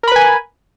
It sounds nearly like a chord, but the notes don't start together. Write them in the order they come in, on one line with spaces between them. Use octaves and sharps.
A#4 B5 B4 G#5